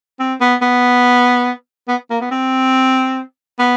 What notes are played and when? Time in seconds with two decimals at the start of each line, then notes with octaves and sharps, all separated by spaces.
0.19 C4
0.41 B3
0.62 B3
1.88 B3
2.10 A#3
2.21 B3
2.31 C4
3.59 B3